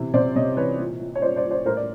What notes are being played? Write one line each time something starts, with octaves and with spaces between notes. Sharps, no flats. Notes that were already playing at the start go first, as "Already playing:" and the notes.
Already playing: C3 E3
C3 C5 D5
C3 C#5 D#5
E3 B4 C#5
A#2
A#2
C#5
A#2 C5 D5
C5 D5
A#2
C5 D5
A2 A#4 C5
D5